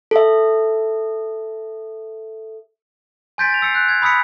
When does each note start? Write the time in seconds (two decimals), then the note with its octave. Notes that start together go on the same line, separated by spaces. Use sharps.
0.11 A4 E5
3.38 G#5 C6 G6 A6 B6 D7
3.50 A6 F7
3.62 E6 A6 C7 C#7
3.75 F#6
3.89 G#6
4.02 B5 D#6 E6 B6 C#7